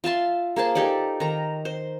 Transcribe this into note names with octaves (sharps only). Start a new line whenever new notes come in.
F4 E5 A5 C6
A#3 G#4 C5 A5
D#4 G4 A4 D5
D#3 A#5
C5